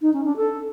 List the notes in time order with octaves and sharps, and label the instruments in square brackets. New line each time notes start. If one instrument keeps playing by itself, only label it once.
[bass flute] D#4
C#4
D4
A4